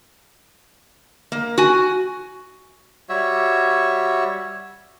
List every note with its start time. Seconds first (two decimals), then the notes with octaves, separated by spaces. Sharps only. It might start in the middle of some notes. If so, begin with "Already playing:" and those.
1.32 A#3
1.58 F#4 G#5
3.09 G3 F#4 C#5 E5